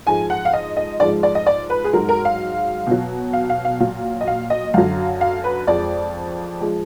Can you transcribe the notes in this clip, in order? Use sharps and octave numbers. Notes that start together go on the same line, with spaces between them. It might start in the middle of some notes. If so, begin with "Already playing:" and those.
G#2 F3 G#3 G#5
F#5
F5
D#5
D#5
G#2 F3 G#3 D5
D5
D#5
D5
B4
G#4
G#2 F#3 A#4
A#4
F5
B2 F#3
F5
F5
F5
A#2 F#3 F5
D#5
F5
D#5
F#2 D3 F#3 F5
F5
B4
F2 F3 G#3 D5
F3 G#3